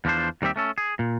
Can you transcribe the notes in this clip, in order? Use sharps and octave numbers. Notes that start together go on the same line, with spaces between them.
E2 F3 D4 C5
D#2 G3 C4 G4 E5
A3 C#4 A4
G#4
A#2